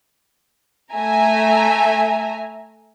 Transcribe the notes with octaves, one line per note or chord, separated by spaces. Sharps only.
A3 E5 G#5 A#5